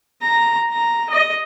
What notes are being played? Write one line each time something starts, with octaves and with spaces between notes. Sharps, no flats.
A#5
A#5
D#5